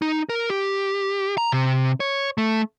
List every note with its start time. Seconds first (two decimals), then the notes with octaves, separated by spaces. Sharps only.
0.02 D#4
0.29 A#4
0.50 G4
1.38 A#5
1.52 C3
2.00 C#5
2.38 A3